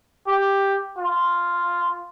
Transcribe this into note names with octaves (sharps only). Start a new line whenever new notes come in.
G4
F4